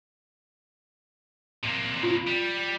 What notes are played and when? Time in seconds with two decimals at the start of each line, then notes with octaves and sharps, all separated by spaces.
1.64 C3 A#3
2.03 F4
2.27 G3